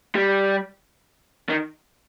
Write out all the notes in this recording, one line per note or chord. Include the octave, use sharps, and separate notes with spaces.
G3
D#3